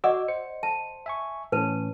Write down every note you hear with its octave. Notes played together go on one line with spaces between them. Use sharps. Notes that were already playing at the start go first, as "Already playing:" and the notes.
F#4 D5 D#5 F#5 D6 E6
C5 C#7
A5
E5 G#5 C#6
A2 E3 C#4 B4 A5